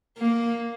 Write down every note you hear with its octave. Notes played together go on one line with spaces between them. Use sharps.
A#3